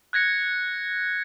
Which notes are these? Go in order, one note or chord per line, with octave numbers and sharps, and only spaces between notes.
F#6 G#6 A#6 C#7